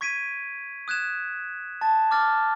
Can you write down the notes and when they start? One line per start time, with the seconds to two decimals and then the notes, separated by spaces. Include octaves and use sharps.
0.01 C#6 G#6 B6 D7 D#7
0.88 D#6 F#6 G#6 E7
1.81 A5 A6
2.11 D6 F6 A6